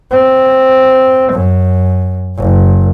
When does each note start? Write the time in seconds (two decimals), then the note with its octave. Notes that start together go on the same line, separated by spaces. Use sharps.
0.12 C4
1.33 F#2
2.38 F#1